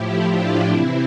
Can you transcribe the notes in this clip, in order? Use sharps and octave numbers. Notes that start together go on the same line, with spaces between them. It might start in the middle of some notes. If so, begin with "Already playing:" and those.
Already playing: A2 F3 E4 G4
D4 F4
C3 E3 C4 E4